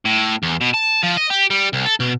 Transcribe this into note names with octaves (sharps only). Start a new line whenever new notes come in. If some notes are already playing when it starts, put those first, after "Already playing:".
A2
E2
B2
A5
F3
D#5
G4
G3
C2
A4
B2